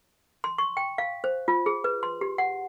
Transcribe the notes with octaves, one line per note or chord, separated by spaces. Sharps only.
C6
C#6
G5
F5
C5
F4
G#4
B4
C6
G4
F#5